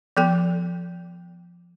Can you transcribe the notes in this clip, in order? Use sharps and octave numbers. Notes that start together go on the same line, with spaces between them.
F3 B3 A4 G5